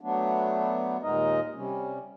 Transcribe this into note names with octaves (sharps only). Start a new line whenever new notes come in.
F#3 A3 B3 D4
D#2 A#2 G#3 D#4 A#4 D#5
C3 G3 C#4